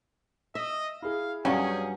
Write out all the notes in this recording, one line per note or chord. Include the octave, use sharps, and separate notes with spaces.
D#5 E5
E4 G#4 F5
G2 F#3 C#4 G#4 D5 F5 G5